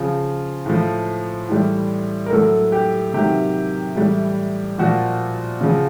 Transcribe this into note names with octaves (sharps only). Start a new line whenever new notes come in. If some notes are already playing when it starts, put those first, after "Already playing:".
Already playing: C#3 F3
A2 F3
A2 E3 G3
A#4
A2 F#3 A4
G4
C3 D#3 F#3 G4
A2 E3 G3
A#2 F3 F#4
C#3 F3